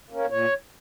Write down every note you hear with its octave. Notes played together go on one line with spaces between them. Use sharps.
A#3 C#4
A#2 C#5